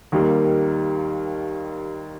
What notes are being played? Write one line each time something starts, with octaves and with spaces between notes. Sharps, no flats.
D#2 D#3 G3 A#3